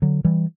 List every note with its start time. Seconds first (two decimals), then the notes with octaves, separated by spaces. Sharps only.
0.02 D3 F#3
0.25 E3 G3